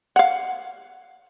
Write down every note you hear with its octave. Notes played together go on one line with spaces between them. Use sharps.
F5 F#5